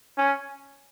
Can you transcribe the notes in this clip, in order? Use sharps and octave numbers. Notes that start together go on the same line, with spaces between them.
C#4